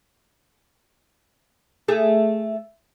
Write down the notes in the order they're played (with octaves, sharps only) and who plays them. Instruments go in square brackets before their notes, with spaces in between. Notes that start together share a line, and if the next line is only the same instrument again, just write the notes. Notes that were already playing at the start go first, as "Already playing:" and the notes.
[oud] A3 G#4